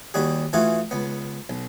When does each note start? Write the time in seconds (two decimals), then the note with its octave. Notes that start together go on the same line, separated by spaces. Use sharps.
0.14 D#2 G3 F#4 G#4
0.53 E3 A3 F4 F#4 G#4
0.91 C#2 B3
1.50 B1